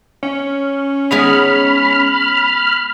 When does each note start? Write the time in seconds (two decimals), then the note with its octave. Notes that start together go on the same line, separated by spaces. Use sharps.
0.23 C#4
1.11 G#3 B3 D#4 B5 F6